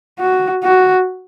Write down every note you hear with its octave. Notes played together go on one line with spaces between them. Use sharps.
F#4
F#4